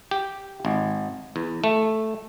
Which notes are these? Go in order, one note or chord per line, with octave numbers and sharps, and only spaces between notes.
G4
G#1
E2
A3